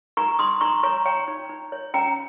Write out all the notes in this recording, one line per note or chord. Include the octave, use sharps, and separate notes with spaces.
D#4 A#5 C#6
D#4 C6 D#6
D#4 A#5 C#6
C#5 A#5 C#6
C#5 G5 A#5
D#4
D#4
C#5
C#4 G5 A#5